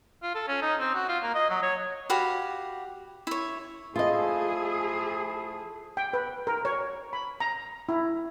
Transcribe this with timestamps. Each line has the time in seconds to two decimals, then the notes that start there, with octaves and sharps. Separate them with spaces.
0.23 F4
0.35 A4
0.48 C#4
0.62 D#4
0.80 C4
0.95 F#4
1.09 F4
1.23 A#3
1.35 D#5
1.50 F#3
1.63 C#5
2.10 F#4 G4 F5 B5
3.27 E4 C#5
3.96 F3 A3 E4 F4 G#4 D#5
5.97 G5
6.13 B4
6.47 A#4
6.65 C#5
7.13 B5
7.40 A#5
7.89 E4